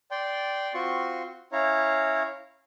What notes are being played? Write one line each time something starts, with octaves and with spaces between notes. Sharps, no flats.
D5 G5 C6
C4 F4 F#4 C6 C#6
C#4 E4 C#5 F5 A#5